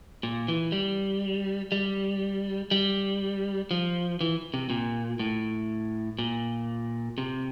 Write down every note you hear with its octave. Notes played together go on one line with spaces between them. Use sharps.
A#2
E3
G3
G3
G3
F3
E3
C3
A#2
A2
A#2
C3